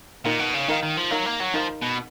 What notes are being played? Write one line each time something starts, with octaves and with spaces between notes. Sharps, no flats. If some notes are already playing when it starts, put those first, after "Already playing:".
A#2 D#4 A#4 F5
B2
C#3
D#3 D#4 A#4 F5
D#3
F3
F#3 D#4 A#4 F5
A#3
F#3
F3 D#4 A#4 F5
B2